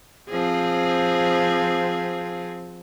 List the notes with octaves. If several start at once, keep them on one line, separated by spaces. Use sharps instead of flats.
F3 C4 G#4